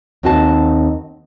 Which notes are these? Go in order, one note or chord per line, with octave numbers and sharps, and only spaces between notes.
D#2 C4 D#4 F#4 D#5 A5